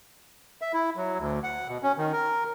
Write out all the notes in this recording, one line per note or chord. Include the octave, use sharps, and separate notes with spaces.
E5
E4
F#3
D2
F#5
B2
C#4
D#3
A#4